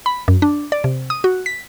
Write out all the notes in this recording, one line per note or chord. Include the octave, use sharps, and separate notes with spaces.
B5
F#2
D4
D5
C3
D#6
F#4
B6